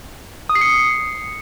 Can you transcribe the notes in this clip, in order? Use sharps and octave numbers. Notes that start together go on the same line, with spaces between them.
D#6
C7
C#7